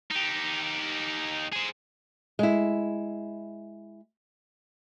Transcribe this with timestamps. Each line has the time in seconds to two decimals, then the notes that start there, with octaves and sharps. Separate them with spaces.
0.11 D#4 G4
1.52 G#4 C5
2.39 G#3 E4